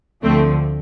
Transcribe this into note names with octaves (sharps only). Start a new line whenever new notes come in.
D2 D3 F3 A3 C4